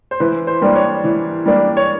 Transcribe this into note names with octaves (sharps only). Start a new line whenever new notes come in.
C5
E3 B4
C5
G3 A#3 D4
C#5
E3
G3 A#3 D4
C#5